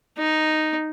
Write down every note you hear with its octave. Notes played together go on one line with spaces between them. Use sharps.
D#4